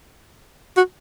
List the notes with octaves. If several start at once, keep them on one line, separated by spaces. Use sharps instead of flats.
F#4